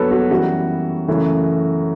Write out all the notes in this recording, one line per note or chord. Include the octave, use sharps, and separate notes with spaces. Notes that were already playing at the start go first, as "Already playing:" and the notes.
Already playing: G2 F#3 B3 A4 B4 C#5
F#4
F#2 E3 G3 F#4
F#2 C#3 E3 A3